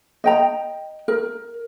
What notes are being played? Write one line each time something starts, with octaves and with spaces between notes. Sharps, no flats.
D#5 G5 A#5
A#4